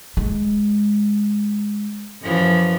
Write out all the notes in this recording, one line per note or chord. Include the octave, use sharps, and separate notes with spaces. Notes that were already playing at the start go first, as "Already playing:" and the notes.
G#3
F#2 E3 F3